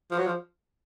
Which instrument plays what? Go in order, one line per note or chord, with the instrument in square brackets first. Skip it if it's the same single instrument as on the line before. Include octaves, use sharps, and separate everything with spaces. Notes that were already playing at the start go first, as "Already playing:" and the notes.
[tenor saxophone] F3
F#3
F3